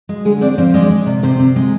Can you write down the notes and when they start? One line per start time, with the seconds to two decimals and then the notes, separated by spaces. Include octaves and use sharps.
0.09 G#3
0.25 D3 G#3 G#4
0.41 C4 D4 D5
0.58 F3 C4 C5
0.74 G#3 D4 D5
0.91 G#3
1.06 C3
1.23 C3 C4 C5
1.39 C3
1.56 G#3